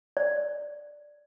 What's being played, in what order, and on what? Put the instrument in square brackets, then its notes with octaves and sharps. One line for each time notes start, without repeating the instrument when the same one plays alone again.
[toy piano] D5